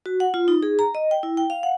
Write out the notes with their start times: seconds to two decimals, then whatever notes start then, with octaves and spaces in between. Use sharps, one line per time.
0.06 F#4
0.20 F#5
0.34 F4
0.48 D#4
0.63 G#4
0.79 A#5
0.95 D#5
1.11 G5
1.23 E4
1.37 G5
1.50 F5
1.63 F#5